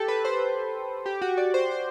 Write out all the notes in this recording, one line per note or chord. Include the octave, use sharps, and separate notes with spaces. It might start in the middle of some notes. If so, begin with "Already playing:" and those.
Already playing: G4 A4
B4
C5
G4
F#4
D5
C5
C5